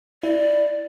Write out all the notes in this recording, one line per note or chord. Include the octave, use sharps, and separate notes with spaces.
E4 D5